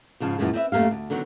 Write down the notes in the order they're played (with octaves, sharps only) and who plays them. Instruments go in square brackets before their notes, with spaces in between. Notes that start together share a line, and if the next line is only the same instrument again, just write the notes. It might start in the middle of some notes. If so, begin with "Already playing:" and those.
[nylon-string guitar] G#2 C#3 F3 A5
F#2 A#2 E3 F3 G#3
C4 B4 D#5 E5
F#2 A3 A#3 G4 F5
D2
D3 D#3 F#3 B3 C4